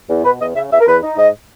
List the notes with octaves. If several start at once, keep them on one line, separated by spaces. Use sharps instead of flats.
E2
B2 B4
E2 D#5
C#3 E5
E2 E5
A#4
E2 B4
D#4
G#2 D#5